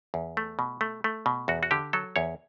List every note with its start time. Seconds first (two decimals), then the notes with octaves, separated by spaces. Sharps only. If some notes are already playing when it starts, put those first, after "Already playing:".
0.14 E2
0.37 A3
0.59 B2
0.81 A3
1.04 A3
1.26 B2
1.48 E2 F#4
1.63 F#4
1.71 D3 G4
1.93 F#3 A4
2.16 E2 C#5